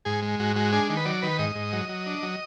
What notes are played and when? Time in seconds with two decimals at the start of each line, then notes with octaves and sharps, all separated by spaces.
0.05 G#2 G#4
0.22 G#3
0.39 G#2 F#4
0.56 G#3 F#4
0.73 D4 G#4
0.89 D#3
0.97 B4
1.05 F#3 D5
1.22 D#3 B4
1.39 G#2 D#5
1.55 G#2
1.73 F#3
1.89 F#3
2.06 D4
2.23 F#3